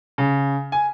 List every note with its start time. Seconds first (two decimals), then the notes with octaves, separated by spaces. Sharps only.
0.18 C#3
0.72 G#5